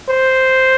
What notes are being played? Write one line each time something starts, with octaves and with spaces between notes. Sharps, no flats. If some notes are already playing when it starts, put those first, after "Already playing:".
C5